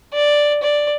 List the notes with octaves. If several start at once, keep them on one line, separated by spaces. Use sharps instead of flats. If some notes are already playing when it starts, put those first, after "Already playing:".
D5
D5